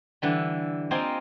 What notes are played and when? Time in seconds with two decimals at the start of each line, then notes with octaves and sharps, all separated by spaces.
0.22 D3 E3 G3
0.91 A#3 C4 F4 D#5 G5 G#5